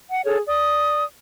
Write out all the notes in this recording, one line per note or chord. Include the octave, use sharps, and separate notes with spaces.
F#5
G#4 A4 C#5
D5 D#6